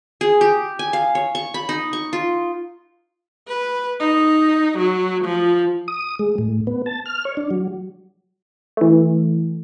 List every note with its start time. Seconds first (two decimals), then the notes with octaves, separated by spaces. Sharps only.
0.21 G#4
0.41 G4
0.79 G#5
0.93 F5
1.15 C#5
1.35 C#6
1.54 B5
1.69 D#4
1.93 C#6
2.13 F4
3.48 B4
4.00 D#4
4.78 F#3
5.25 F3
5.88 D#6
6.19 G#3
6.38 A2
6.67 B3
6.86 A5
7.06 F6
7.25 C#5
7.37 D4
7.51 F#3
8.77 E3 A3